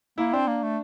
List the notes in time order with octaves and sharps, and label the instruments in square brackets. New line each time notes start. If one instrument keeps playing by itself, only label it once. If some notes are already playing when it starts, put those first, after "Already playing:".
[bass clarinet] A#3 [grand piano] E4
[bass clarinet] C4 [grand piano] D4
[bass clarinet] A#3
A3